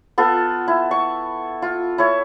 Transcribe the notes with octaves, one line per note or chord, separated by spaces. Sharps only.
B3 F4 A4
E4
C#6
F4
E4 C#5